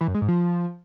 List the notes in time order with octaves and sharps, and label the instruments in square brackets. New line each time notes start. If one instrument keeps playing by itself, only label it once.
[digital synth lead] E3
F#2
G#3
G#2
F3